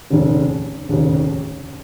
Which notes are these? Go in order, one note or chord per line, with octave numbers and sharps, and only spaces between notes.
F1 D#2 C#3
F1 D#2 C#3